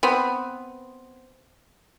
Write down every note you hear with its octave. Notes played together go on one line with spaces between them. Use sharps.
B3 C4